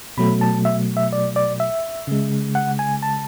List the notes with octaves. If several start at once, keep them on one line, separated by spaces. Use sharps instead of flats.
B2 F#3 A3 B5
A5
E5
E5
D5
D5
E5
C#3 G#3
F#5
G#5
A5